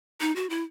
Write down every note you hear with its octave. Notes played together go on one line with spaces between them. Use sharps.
D#4
F#4
E4